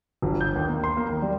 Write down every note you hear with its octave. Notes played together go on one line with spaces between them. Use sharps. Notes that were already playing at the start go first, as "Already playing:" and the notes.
G1
G6
D#2
A#3
C6
A#3
D#2
G3